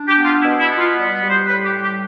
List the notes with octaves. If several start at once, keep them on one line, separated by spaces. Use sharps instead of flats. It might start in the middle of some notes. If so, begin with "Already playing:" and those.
Already playing: D4
G4
B3
F4
B2 E4
E4
B3
F4
G3
G3
C5
A2 B4
G4
G3
G4